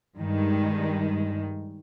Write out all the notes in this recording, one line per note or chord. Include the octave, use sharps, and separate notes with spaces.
G2 D#3 G#3